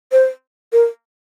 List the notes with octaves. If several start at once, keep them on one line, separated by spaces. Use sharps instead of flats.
C5
A#4